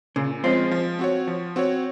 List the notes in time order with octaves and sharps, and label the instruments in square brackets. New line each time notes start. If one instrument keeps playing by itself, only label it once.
[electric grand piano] A#2 [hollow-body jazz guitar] C#3
[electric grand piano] F3 G#3 C#4 F4 [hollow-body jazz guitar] C4
[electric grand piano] F3
C4 F#4 C#5
F3
C4 F#4 C#5